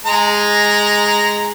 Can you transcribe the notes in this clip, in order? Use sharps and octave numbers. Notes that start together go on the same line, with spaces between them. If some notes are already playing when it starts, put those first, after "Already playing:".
G#3 A#5